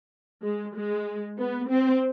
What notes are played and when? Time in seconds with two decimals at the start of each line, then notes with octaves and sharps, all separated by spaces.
0.43 G#3
0.75 G#3
1.38 B3
1.70 C4